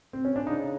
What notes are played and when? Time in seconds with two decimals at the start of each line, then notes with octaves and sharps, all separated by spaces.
0.13 C4
0.25 C#4
0.36 D4
0.46 C#3 D#4